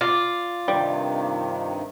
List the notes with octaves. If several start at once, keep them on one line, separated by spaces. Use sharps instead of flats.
F4 D5
G2 C3 D#3 G3